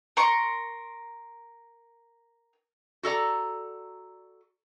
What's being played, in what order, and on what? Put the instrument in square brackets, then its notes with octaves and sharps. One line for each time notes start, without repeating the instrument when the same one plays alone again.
[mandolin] A#4 C6 C#6
[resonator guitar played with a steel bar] F#4 A4 D5 A#5